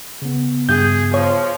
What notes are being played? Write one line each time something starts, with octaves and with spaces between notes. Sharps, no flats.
C#3 B3
G2 G#4 G6
F3 C#5